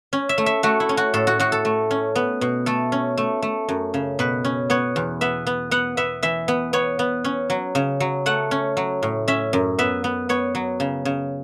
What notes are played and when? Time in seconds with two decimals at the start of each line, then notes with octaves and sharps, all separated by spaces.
0.13 C#4
0.29 E5
0.38 A3
0.46 E5
0.63 A3 F#4
0.80 E4
0.89 C#4
0.97 F#4
1.14 A2 A4
1.27 F#4
1.40 A2 F#4
1.52 A4
1.65 A3
1.91 C#4
2.15 B3
2.41 B2
2.66 A3 A4
2.92 C#4
3.17 A3
3.42 A3
3.69 F#2
3.94 C#3
4.19 B2 B4
4.45 C#4
4.70 B3 C#5
4.96 E2
5.21 B3 E5
5.47 B3
5.71 B3 F#5
5.97 B3 E5
6.23 E3 E5
6.48 B3
6.73 B3 C#5
6.99 B3
7.24 C#4
7.50 F#3
7.75 C#3
8.00 F#3
8.26 A3 F#5
8.51 C#4
8.77 F#3
9.03 A2
9.28 C#4 E5
9.53 F#2
9.79 B3 E5
10.04 B3
10.29 B3 C#5
10.55 F#3
10.80 C#3
11.05 C#3